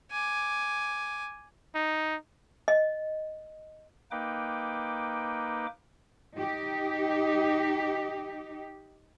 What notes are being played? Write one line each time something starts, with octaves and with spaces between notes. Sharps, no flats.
G#5 D6
D#4
D#5
A#3 D#4 B4 G5 D6
D#4 G4